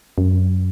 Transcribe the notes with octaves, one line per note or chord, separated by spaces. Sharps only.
F#2